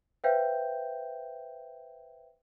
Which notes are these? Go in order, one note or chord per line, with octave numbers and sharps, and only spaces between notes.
B4 C5 E5 F5 G5 G6